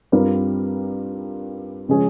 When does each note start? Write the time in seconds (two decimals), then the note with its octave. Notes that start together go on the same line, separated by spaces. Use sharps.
0.12 G2 G3 C4 F4 A#4
1.89 C#3 F3 G#3 C#4 G#4